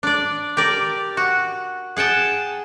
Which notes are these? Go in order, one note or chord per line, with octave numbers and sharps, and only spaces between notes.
D4 D5
G4 A#4 D5
F#4
G#4 F#5 G5 A5